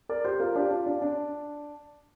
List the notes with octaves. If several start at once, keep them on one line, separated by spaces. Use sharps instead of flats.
A#4 D5
G4 C5
F4 A#4
D4 G4
F4
D4
D4